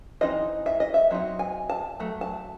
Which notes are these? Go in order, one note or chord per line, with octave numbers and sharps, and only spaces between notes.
E3 C4 D#4 D#5
E5
D#5
E5
F#3 C4 D#4
G#5
A5
F#3 A3
A5